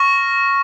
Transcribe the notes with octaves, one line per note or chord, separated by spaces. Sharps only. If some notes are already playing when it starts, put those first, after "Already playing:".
Already playing: C#6 F6 A#6